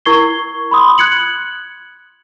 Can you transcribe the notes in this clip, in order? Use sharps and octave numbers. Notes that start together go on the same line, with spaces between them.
E4 A#4 C#6 G#6 C7 G7
B5 C6 D#6
F#6 G#6 C#7 F#7